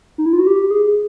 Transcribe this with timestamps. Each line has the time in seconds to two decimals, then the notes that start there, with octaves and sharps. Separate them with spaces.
0.18 D#4
0.26 E4
0.33 F4
0.39 F#4
0.47 G4
0.71 G#4